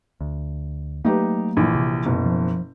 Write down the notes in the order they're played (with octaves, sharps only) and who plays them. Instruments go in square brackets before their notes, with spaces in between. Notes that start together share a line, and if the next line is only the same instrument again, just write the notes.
[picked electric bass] D2
[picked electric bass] F#3 A3 A#3 [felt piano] D#4 G4 B4
[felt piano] A#1 E3
[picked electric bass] C3
[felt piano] F#1 B2
[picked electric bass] F3